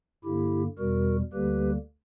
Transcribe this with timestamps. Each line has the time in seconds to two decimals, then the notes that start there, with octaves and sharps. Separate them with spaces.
0.24 G2 D3 A#3 E4 G4
0.78 E2 B2 G3 F#4 A#4
1.33 D2 D3 G3 A#3 G4 B4